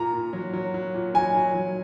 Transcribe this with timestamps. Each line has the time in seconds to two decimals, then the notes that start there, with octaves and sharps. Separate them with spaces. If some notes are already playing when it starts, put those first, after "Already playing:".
Already playing: A#2 A#5
0.13 A#2
0.33 F#3
0.54 F#3
0.74 F#3
0.94 A#2
1.14 F#3 G#5
1.35 F#3
1.54 F#3